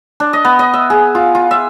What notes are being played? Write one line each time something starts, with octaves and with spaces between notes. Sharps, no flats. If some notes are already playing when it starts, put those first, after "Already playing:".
D4
D#5
B3
D#5
E5
G#4
F4
F4
E5